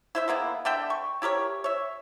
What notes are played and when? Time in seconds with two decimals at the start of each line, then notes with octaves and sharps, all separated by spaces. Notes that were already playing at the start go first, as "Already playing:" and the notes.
0.15 E4 C5 E5
0.28 G#3 A#3 B3 E4
0.65 D3 D5 E5 G5
0.90 C#6
1.22 E4 G4 A#4 C#5
1.64 C#5 E5